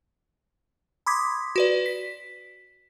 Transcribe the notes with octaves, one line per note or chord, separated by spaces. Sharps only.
B5 C6 D6 D#6 G#6 B6
F#4 B4 D5
B6